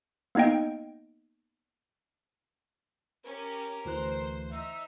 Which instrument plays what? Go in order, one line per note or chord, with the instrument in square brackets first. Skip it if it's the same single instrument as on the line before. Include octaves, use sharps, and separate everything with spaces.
[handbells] A#3 B3 D#4 D#5 G5
[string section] C#4 G4 [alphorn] A#4
[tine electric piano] D2 E3 F#6 [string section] C5
[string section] D#4 [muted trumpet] E5